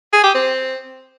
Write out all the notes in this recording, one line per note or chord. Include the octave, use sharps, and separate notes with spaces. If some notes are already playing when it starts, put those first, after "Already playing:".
G#4
G4
C4